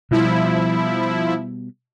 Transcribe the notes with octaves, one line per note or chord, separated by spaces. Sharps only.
B2 F3 G3 E4